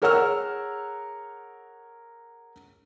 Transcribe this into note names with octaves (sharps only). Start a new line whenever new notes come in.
G#4 A#4 C#5 F#5 E6 F6